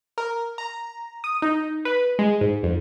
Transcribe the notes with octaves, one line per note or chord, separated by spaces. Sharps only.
A#4
A#5
D#6
D#4
B4
G#3
G#2
F2